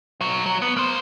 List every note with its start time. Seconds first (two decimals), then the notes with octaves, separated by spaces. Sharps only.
0.21 B1 F#3
0.46 F#3
0.62 B3
0.77 A#3 C5